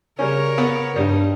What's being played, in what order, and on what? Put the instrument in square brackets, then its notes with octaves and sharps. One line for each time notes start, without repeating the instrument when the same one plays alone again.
[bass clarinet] C#3 [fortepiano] G3 C#4 [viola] A#4 C#5
[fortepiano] B3
[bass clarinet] G2 [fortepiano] G3 [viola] D#4